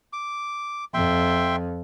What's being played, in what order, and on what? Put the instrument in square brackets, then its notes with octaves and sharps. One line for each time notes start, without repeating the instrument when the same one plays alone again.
[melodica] D6
[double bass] F2 [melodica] E5 G5 C6